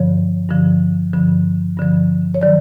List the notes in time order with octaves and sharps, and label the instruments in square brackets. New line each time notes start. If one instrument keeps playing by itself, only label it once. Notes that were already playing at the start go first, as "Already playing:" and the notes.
Already playing: [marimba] G2 D3 F3 C#5
G2 D3 F3
G2 D3 F3
G2 D3 F3
C#5
D#3 F#3 D5